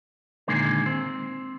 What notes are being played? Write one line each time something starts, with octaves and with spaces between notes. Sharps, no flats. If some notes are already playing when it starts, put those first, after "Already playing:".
A#2 D3 D#3 G#3 A#3
C4